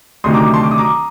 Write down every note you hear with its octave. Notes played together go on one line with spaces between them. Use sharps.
D2 C3 D#3 F#3 A3 C6 D#6
A#5 D6
A5 C6
D6
D#6
A#5 D6